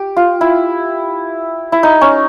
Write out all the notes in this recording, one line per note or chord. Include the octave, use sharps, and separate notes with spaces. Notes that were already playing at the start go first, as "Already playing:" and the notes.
Already playing: G4
F4
E4
E4
D#4
C#4